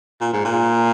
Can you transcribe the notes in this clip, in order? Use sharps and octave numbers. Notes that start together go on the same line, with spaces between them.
A#2
G#2
A#2